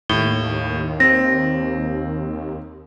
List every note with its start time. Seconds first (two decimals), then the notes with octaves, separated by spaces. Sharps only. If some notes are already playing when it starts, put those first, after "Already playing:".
0.09 D#2 A2 G7
1.00 C4 A#6